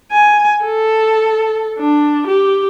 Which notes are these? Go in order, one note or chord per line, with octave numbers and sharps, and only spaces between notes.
G#5
A4
D4
G4